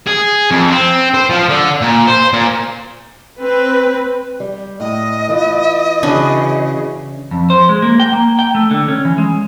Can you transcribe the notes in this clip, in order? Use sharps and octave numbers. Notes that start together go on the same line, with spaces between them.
G#4
F2
C4
C5
F3
D3
A#2
C5
A#2
C4 B4
G3
A2 D#5
E3 F4
C#3 E3 C#4 D4 E4 F#4 B4
F2
C5
G#3
A#3
G5
A#3
G5
A3
D3
C#4
E3
G#3